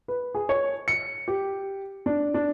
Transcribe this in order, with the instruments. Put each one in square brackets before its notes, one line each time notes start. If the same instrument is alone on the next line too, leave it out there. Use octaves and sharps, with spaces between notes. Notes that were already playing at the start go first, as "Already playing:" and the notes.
[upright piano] B4
G#4
C#5
C#7
G4
D4
D4